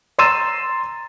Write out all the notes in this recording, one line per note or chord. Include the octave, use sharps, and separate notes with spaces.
A#5 C6 E6 A6 D#7 E7